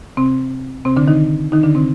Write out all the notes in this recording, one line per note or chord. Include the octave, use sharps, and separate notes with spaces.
C3 C4
C3 C4
D3 D4
D#3 D#4
D#3 D#4
D3 D4
C3 C4